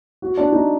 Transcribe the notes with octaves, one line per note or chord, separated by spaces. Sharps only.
F#4
D4
D#4